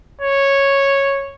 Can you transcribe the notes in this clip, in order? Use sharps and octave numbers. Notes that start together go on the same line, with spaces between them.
C#5